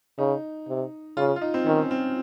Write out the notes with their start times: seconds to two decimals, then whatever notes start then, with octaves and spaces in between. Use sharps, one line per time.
0.18 C#3 D#4
0.68 C3
1.17 C#3 F4
1.36 F4
1.42 D#4
1.54 C4
1.66 D#3 C#4
1.91 C4